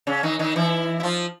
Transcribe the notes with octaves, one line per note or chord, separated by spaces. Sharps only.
C#3 C#4
D#3 D#4
D#3 D#4
E3 E4
E4
F3 F4